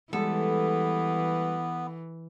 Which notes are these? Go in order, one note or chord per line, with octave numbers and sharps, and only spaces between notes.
E3 G3 G#3 B3 A4